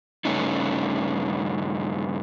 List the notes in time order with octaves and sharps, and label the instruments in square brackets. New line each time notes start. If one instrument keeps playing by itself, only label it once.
[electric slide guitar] G2 C#3 A3 C#4 D#4